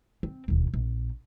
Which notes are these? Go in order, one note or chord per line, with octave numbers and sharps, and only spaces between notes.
C4
E1 D#2
A#1